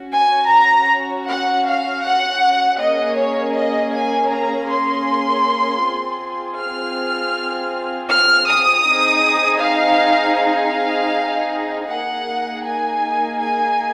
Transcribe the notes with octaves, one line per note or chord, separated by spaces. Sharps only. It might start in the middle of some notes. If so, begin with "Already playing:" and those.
Already playing: C#4 F#4
G#5
A#5
F#5
F5
F#5
A#3 C#4 G#4 D#5
C#5
D#5
G#5
A#5
C6
C4 F4 G#4
F6
F6
D#6
C4 D#4 G#4
F5
F5
A#3 D#4 G#4 F#5
G#5
G#5